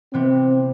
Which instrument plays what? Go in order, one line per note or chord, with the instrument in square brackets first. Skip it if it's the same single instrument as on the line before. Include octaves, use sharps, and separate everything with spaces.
[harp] C3 E3 B3 [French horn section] C4